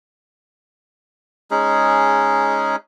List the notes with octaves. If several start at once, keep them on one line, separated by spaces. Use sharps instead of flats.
G#3 C#4 D#4 G#4